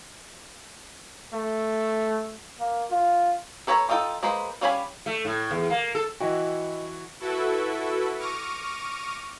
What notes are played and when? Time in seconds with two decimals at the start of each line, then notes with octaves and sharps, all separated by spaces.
1.33 A3
2.59 A#3
2.90 F4
3.67 A4 B4 C#5 D#5 A#5
3.89 D4 D#4 F4 A4 G5
4.23 G#3 A#3 B4 C5
4.61 G3 C#4 F5 G#5 B5
5.06 A3
5.25 A2
5.51 E2
5.70 A#3
5.95 A4
6.20 E3 E4 F#4 D#5 G5
7.20 E4 F#4 A4 B4 E5
8.18 C#6 D6 F6 A#6 D#7